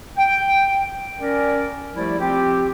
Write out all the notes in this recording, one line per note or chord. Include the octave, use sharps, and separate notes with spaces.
G5
C#4 A#4 D5
F3 G3 A3 E4 G4 D5
F3 C4 F4 G4